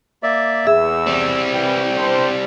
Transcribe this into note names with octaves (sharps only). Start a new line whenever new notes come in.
A#3 D5 E5
E2 G#4 E5 E6
G3 C4
E3 G5
B3 D4 C5